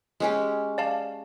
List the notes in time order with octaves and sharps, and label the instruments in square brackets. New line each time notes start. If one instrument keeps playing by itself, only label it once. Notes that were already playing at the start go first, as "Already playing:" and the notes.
[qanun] G#3 C#4 G4
[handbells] D5 F5 A5